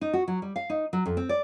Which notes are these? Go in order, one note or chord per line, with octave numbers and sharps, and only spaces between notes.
D#4
F#4
F#3
G3
F5
D#4
F#3
F2
C4
D5